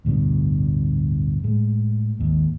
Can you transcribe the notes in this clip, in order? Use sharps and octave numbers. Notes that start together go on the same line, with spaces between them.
A1 D2 G2 B2
A2 G#3
G#1 D#2